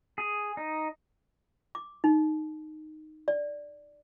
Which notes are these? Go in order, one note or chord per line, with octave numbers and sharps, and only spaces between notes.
G#4
D#4
D6
D#4
D5